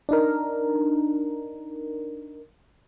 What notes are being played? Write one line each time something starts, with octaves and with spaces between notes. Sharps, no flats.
D4 D#4 A#4